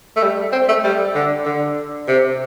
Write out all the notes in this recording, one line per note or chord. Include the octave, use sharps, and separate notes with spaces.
A3
G3
C4
A3
G3
D3
D3
C3